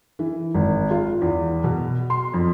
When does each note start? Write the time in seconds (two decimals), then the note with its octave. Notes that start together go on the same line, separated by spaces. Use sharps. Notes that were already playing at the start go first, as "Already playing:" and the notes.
0.19 E3
0.54 G#1
0.91 F4
1.22 E2
1.64 B2
2.10 C6
2.34 F2